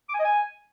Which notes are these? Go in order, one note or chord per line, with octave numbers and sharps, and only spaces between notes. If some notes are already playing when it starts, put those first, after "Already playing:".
D6
G#5
D#5
G#5